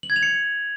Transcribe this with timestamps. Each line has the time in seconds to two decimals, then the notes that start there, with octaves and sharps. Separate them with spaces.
0.03 F#7
0.10 G#6
0.16 F7
0.23 C#7